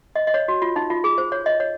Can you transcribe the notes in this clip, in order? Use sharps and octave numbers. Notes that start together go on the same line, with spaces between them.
D#5
D#5
C#5
F#4
F4
D#4
F4
G#4
C5
C#5
D#5
C#5